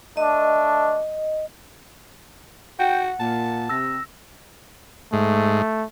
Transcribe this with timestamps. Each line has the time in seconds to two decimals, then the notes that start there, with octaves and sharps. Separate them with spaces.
0.17 A3 D4 D#5
2.79 F#4 F#5 G5
3.20 A#2 A5
3.70 C3 E6 A#6
5.13 G#2 A3